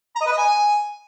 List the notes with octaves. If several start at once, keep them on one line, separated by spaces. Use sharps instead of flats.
A#5
D#5
B4
D#5
G#5